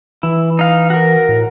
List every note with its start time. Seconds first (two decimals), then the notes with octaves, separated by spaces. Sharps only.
0.23 E3 E4
0.59 D#4 F5
0.90 F#4 A#4
1.29 A2